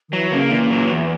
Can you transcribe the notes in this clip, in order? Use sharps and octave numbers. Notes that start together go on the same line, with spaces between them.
D#3
E3 F#3
C#3 A#3
A#2 E3
F#3
E2